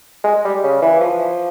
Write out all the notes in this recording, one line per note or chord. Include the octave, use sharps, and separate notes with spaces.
G#3
G3
C#3
E3
F3